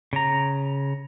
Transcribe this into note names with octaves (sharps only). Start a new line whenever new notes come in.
C#3 A#5